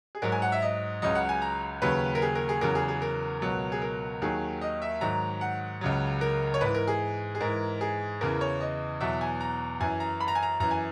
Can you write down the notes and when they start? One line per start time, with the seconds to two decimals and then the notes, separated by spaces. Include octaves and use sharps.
0.15 G#4
0.22 G#2 F#3 A#4
0.32 G#5
0.42 F#5
0.52 E5
0.62 D#5
1.02 C#2 C#3 F#3 D#5
1.15 F#5
1.29 G#5
1.42 A#5
1.82 D#2 C#3 F#3 B4
2.15 A#4
2.22 G#4
2.35 A#4
2.49 G#4
2.61 E2 C#3 F#3 A#4
2.75 G#4
2.88 G#4
3.02 A#4
3.42 C#2 B2 F#3
3.72 G#4
3.82 A#4
4.21 D#2 D#3 F#3 G#4
4.61 D#5
4.82 E5
5.01 G#2 D#3 F#3 A#5
5.41 F#5
5.81 C#2 C#3 F#3
6.21 A#4
6.54 C#5
6.61 G#2 E3 B4
6.75 A#4
6.88 G#4
7.35 G#4
7.41 G#2 E3 A#4
7.81 G#4
8.21 E2 C#3 E3 A#4
8.41 C#5
8.60 D#5
9.00 E2 B2 F#3 E5
9.21 G#5
9.41 A#5
9.80 F#2 E3 G#5
10.00 A#5
10.20 B5
10.28 A#5
10.35 G#5
10.43 A#5
10.60 F#2 E3 A#5
10.71 G#5